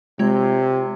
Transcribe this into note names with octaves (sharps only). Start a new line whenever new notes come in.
C3 G#3 F4 G#6